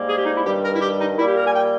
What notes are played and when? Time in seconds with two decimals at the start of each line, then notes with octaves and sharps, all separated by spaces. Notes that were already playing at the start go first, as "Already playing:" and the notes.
Already playing: G#2 G3 A#3
0.08 G#4
0.17 G4
0.25 D#4
0.35 E4
0.45 G2 D#3 G3 G4
0.63 A#4
0.74 E4
0.80 G4
0.99 D#4
1.17 A#2 G3 A#3 E4
1.27 G4
1.36 A#4
1.45 G#5
1.54 G5